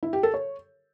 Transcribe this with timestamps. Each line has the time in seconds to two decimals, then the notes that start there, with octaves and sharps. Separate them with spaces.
0.03 E4
0.13 G4
0.23 A4
0.34 C#5